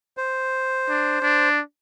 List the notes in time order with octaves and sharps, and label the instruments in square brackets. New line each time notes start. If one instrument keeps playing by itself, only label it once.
[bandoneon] C5
[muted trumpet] D4
D4